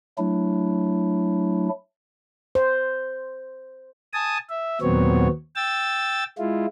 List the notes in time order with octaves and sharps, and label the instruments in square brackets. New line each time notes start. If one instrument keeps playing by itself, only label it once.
[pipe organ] F#3 A3 D4 E4
[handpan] C5
[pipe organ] G#5 A5 D#6
E5
D#2 A#2 F#3 B3 C4 C#5
G5 E6 A6
G#3 E4 F4